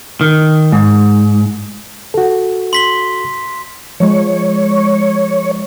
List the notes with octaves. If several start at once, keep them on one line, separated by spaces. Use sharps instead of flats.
D#3
G#2
F#4 A4
C6 B6 G7
F3 G#3 C#5